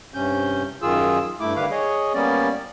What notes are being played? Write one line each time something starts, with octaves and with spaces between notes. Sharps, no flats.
G2 C3 C#4 G6
F#2 D#3 F4 G#4 E6
G2 A3 E4 D6
D3 D#3 G3 B4 F5 D6
G#4 C#5 D#5
G3 A#3 B3 C#4 D5